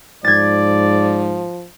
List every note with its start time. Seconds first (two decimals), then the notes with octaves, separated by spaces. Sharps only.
0.24 G#2 F3 D5 G#6 A6